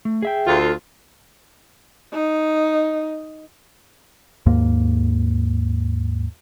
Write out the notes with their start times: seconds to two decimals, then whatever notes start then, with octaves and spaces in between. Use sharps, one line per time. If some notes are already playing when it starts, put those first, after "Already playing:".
0.05 A3
0.22 G#4 E5 G5
0.47 D2 F4
0.59 A4
2.13 D#4
4.46 D#2 G#2 A#3